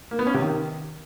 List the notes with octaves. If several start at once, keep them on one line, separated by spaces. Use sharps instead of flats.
A#3
B3
C#4
C3
D#3